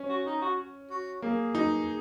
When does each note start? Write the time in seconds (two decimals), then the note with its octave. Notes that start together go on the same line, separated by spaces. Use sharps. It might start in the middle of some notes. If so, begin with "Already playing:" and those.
Already playing: C#4
0.09 F#4
0.26 D#4
0.42 F#4
0.91 F#4
1.22 A#3 G#4
1.55 D#4